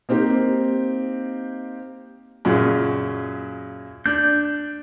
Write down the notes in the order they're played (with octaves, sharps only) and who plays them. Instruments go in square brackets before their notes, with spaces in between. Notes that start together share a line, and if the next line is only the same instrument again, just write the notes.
[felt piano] A#3 C4 D#4 G4
[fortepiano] F#2 A#2 C#3
[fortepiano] D4 [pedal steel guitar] G6